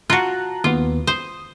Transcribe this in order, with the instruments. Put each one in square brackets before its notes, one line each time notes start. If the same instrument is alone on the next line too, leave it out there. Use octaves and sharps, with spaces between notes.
[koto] F4 F#4 [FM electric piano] A5 A#5 F#6
[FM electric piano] D#2 B3 [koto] F4
[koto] C5 [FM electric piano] D#6